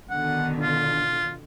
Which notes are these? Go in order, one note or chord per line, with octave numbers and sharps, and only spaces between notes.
B2 D3 D#3 F#5
F4